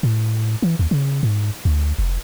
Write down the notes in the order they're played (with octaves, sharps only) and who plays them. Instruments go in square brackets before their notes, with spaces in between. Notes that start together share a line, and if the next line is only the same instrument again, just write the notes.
[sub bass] A2
E3
D#2
C#3
G#2
D2
F1